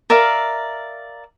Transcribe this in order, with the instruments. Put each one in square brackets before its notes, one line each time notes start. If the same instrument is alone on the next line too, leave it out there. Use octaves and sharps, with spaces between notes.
[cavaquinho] A#4 D5 E5 F5